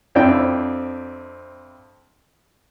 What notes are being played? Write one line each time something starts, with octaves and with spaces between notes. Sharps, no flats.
F2 C4 D4 E4 G5